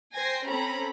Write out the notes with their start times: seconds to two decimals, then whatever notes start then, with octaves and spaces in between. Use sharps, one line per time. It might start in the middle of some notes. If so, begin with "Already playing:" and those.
0.15 C5 G5 G#5 A#6 C7
0.48 C4 C#4 A4 A#5 B5